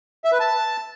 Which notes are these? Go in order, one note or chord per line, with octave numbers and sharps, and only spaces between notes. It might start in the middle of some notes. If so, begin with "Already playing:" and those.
E5
B4
A5